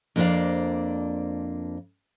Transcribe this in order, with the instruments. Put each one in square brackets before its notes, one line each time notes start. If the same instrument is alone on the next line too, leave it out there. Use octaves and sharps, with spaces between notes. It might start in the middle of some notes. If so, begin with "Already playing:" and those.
[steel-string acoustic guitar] F2 A#3 D4 C5 D5 F5